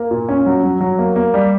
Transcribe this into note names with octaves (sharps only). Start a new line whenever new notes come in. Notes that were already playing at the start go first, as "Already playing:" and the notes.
Already playing: A#3
A#2
C#4
F#3
F#3
F#3
A#3
A#3
G3